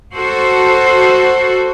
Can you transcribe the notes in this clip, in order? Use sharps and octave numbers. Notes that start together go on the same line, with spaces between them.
F#4 A4 C5